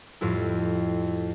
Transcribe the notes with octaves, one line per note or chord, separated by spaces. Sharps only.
F2 A2 G3 E4